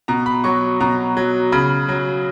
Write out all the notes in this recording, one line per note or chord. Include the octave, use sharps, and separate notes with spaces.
B2 A#5
B5
F#3 C#6
B2 A#5
F#3
C#3 B5
F#3